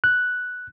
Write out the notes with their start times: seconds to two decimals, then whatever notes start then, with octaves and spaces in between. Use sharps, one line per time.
0.04 F#6